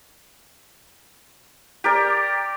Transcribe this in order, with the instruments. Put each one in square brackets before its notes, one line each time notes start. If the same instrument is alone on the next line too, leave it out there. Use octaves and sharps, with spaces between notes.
[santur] G4 A#4 D5